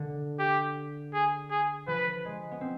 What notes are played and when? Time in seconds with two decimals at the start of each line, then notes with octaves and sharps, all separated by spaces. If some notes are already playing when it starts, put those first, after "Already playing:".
Already playing: D3
0.39 G4
1.14 G#4
1.51 G#4
1.87 F3 B4
2.25 G#3
2.51 B3
2.61 C4